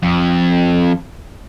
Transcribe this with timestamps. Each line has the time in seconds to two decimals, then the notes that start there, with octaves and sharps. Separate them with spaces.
0.03 F2